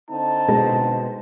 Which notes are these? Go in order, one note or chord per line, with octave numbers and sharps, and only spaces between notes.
D3 C4 D#4 A5
B2 G#3 A#6